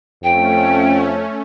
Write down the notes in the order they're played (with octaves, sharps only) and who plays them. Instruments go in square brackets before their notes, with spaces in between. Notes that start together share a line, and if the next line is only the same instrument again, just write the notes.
[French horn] F2 [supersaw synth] A3 C#4 [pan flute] G5